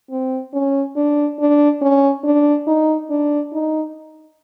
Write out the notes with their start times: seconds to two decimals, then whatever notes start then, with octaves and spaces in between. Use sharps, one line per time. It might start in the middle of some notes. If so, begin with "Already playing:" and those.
0.10 C4
0.53 C#4
0.96 D4
1.39 D4
1.81 C#4
2.24 D4
2.67 D#4
3.10 D4
3.52 D#4